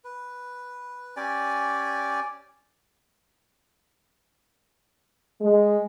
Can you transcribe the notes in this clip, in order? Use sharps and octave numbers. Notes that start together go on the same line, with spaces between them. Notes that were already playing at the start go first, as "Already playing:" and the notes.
B4
C#4 G4 D5 G#5
G#3